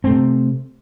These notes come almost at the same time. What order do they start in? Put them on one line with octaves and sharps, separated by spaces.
C4 A3 C3